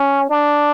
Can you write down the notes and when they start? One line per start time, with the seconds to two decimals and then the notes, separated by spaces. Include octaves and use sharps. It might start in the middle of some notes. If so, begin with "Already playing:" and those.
Already playing: C#4
0.30 D4